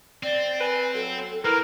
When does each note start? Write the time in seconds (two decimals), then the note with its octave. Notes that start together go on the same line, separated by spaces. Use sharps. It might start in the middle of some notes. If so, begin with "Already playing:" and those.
0.23 C4 D5
0.60 B4 G#5
0.94 F#3 A4
1.45 A#3 E4 A#4 B4